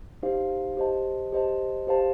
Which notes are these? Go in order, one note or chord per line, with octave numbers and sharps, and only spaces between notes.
D#4 G4 C5 F5
G4 C5 D#5 A5
G4 C5 D#5 A5
G4 C5 F5 A5